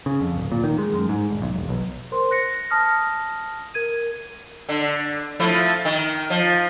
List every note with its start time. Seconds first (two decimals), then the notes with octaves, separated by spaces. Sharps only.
0.06 C#3
0.21 F2
0.37 D1
0.52 A#2
0.64 D#3
0.78 G#3
0.93 F#2
1.09 G#2
1.30 D#1
1.42 B1
1.54 E1
1.69 B1
2.12 A#4 C5 C6
2.31 F#6 A#6 C#7
2.70 A5 D#6 F6 A#6
3.74 A#4 G#6 D#7
4.69 D3
5.40 F3 A3 E4
5.85 D#3
6.30 F3